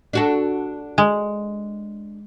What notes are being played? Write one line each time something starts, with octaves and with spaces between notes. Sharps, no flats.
D4 F#4 A4
G#3